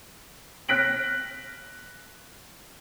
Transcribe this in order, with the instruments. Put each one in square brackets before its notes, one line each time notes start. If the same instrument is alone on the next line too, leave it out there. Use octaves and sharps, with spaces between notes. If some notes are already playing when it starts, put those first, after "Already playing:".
[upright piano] F6 F#6 A#6 B6 D7 F#7